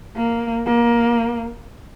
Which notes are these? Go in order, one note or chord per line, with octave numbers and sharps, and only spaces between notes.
A#3
A#3